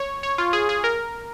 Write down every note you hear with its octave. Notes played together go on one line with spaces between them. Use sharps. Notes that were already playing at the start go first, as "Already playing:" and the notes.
Already playing: C#5
C#5
F4
G#4
G#4
A#4